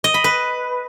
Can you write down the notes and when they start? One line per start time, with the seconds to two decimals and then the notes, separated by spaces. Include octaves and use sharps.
0.04 D#5
0.14 B5
0.24 B4